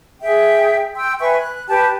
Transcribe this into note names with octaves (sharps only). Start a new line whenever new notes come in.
G#4 E5 G5
G5 C6 E6
B4 E5 G#5 C#6
F#6
G4 B4 G5 A5